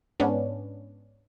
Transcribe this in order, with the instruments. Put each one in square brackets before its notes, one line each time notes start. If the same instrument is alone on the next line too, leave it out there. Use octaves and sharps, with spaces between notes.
[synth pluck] G#2 B3 C#4 D4